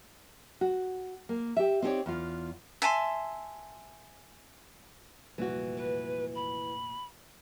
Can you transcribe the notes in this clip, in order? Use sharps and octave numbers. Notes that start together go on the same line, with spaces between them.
F#4
A#3
G4 E5
C4 D#4 G4 G#4 C#5 D5
E2 F4
E5 G#5 A5 C6
F1 A#2 E3 G3 F#4
B4
B5